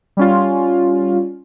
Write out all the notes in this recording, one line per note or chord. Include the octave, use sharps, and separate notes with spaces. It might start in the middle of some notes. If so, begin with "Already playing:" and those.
G3 C#4 F4